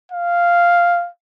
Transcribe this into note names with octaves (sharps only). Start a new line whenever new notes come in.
F5